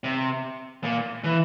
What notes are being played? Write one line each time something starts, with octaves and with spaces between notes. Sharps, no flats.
C3
A#2
E3